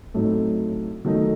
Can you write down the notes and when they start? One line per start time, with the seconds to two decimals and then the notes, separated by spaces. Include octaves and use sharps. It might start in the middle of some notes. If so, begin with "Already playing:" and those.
0.14 A2 F#3 A3 C4 D#4
1.05 D#3 F#3 A3 D#4